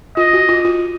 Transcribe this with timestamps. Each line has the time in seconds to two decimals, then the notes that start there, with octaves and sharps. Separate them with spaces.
0.17 F4 D#5
0.33 F#4
0.49 F4
0.65 F4